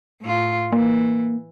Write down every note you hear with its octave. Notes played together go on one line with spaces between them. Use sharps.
A2 F4
E3 A#3